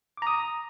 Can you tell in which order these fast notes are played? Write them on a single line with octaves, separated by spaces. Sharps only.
D6 A#5 D#6